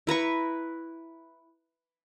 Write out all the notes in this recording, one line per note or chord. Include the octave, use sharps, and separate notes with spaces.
E4 B4 A#5 C#6